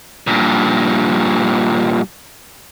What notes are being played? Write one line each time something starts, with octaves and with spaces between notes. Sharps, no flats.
G2 A#2